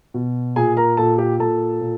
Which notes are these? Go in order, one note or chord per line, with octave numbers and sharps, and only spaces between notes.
B2
A#2 G#4 G#5
A#4 A#5
A#2 A4 A5
G4 G5
A#2 A4 A5
A#2